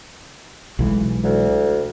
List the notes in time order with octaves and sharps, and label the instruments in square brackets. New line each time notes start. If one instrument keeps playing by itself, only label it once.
[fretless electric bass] B1 E3 G#3
[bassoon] D2